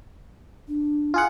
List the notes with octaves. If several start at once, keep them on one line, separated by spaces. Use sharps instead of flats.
D4
F4 G#4 F#5